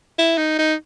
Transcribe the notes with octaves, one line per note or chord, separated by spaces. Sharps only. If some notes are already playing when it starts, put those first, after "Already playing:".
E4
D#4
D#4